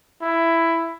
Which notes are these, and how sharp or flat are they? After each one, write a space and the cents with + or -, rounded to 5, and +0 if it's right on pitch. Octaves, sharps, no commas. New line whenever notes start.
E4 +10